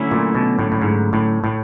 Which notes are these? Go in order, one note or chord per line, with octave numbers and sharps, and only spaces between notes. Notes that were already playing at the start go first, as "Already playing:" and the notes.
Already playing: D3 F#3 A3 C#4 E4
A#2
B2
A2
A2
G#2
A2
A2